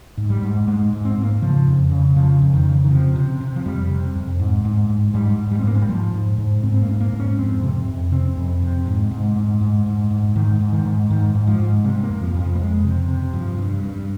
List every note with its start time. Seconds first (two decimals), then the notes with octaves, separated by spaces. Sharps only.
0.17 G#2
0.30 G3
0.43 G#2
0.68 G#2 G#3
0.93 G#2
1.05 C4
1.18 G#2
1.23 A#3
1.42 C#3 F3
1.67 F2
1.91 C#3
2.16 C#3 F3
2.41 F2
2.53 D#3
2.66 C#3
2.84 D#3
2.91 C3 F3
3.16 C3
3.41 C3
3.56 F3
3.65 F2 G3
3.90 C3
4.15 F2
4.39 G#2
4.65 G#2
4.89 G#2
5.14 G#2 G3
5.39 G#2
5.51 G3
5.60 C4
5.64 G#2 A#3
5.74 G#3
5.81 G3
5.89 G#2 F3
6.14 G#2
6.38 G#2
6.63 G#2 C4
6.74 C4
6.82 A#3
6.88 G#2
7.00 A#3
7.13 G#2
7.19 C#4
7.38 F2 C4
7.63 C3
7.88 F2
8.12 C3 C4
8.37 F2
8.62 C3
8.87 G#2
9.11 G#2
9.36 G#2
9.61 G#2
9.86 G#2
10.11 G#2
10.36 G#2 D#3
10.60 G#2
10.73 D#3
10.85 G#2
11.10 G#2 D#3
11.35 G#2
11.47 F3
11.59 G#2
11.84 C3 G3
12.03 A#3
12.09 F2
12.22 F3
12.34 F2
12.40 F3
12.55 A#3
12.59 F2 G#3
12.84 C3
13.08 C3
13.33 G2 F3
13.58 G2
13.83 G2